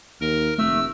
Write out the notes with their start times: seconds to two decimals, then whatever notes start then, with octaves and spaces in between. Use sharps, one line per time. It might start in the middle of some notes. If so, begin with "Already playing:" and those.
0.21 D#2 A#4
0.58 F1 A3 E6